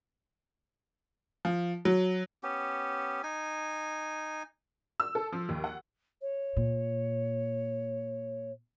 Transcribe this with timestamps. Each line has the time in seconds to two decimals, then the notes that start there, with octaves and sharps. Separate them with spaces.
1.45 F3
1.85 F#3
2.43 B3 C#4 G4
3.23 D#4 G#5
5.00 E6
5.15 A4
5.32 F3
5.49 D#2
5.64 F#5
6.21 C#5
6.56 A#2